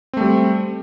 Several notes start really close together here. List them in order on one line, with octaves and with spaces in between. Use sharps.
C4 A3 G3